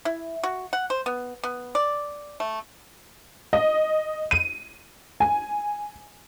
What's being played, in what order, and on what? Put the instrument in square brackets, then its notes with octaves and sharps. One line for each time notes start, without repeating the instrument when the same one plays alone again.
[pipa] E4
F#4
F#5
C5
B3
B3
D5
A3
[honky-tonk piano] D#5
D#7
G#5